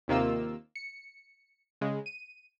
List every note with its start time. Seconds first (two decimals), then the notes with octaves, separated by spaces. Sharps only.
0.08 D#2 C3 D#3 A#3 F4 E6
0.76 C#7
1.81 C#3 G#3
2.06 D#7